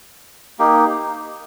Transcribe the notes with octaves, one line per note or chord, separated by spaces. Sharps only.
A#3 D#4 G4